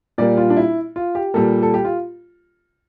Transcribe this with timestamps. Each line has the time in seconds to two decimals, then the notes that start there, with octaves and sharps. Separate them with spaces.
0.18 A#2 G3 A#3 D5
0.37 F4
0.50 D4
0.57 E4
0.96 F4
1.15 G4
1.34 A#2 G3 A#3 A4
1.63 A4
1.74 G4
1.85 F4